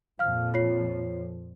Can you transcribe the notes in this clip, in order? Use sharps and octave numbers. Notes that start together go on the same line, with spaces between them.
F2 A#2 F3 F5 F6
F4 C#5 C7